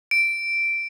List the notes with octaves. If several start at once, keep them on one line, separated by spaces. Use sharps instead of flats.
D7